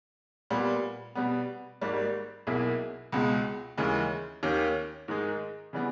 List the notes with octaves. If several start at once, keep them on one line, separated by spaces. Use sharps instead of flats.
A#2 G3 B3
B2 G3 B3
G#1 G#2 G3 A#3
B1 B2 A#3 E4 G#4
C#2 B2 G#3
D#2 C#3 E3 G#3
D#2 D#3 A#3 C#4 G4
G#2 D#3 G#3 D#4 G#4
C#3 E3 G3 B3